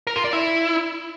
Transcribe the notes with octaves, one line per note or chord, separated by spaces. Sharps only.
A#4
F4
D5
E4